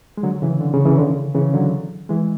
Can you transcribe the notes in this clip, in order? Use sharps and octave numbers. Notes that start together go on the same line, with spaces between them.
G#3
D3 F#3
C#3 E3
D3
C#3
C#3 E3
D3
C#3
C#3 E3
D3 F#3
E3 G#3